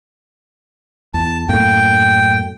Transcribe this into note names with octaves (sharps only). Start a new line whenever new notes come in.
E2 A5
F#2 A2 A#3 G5